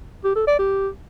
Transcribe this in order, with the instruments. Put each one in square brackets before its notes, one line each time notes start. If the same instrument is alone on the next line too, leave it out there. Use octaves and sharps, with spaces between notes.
[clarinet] G4
A4
D5
G4